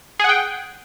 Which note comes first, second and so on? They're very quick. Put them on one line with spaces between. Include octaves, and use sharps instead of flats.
G#4 F#5 G5